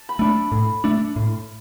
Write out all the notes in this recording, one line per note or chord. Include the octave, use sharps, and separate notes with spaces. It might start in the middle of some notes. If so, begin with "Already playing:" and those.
Already playing: A5
B5
A3 D4
A2
A3 D4
A2